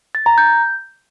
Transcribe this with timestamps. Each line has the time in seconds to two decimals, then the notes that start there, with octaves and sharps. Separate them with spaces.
0.15 A6
0.26 A#5
0.38 G6